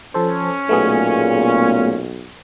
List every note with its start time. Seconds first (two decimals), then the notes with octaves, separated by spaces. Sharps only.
0.14 F3 C#4 A4 C5
0.69 B1 A#2 A3 B3 G#4